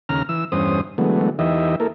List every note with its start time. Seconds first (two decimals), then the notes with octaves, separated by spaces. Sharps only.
0.09 D#2 C#3 A#5 F6
0.29 E3 E6
0.52 E2 G2 C#4 C5 D#6
0.98 D3 E3 F#3 G#3 A3 B3
1.39 E2 E3 D#4 G4 D#5 E5
1.80 A#3 E4 A4 A#4